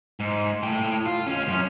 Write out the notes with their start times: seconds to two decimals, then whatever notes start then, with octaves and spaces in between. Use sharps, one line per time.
0.20 G#2
0.63 A2 G5
1.06 F4
1.27 C#4 F4
1.48 F#2 C#4